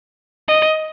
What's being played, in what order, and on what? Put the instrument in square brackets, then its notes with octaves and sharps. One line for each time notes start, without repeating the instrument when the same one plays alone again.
[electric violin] D#5